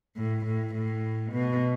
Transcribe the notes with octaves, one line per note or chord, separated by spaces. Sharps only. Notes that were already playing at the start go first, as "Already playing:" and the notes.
A2
A2
A2
B2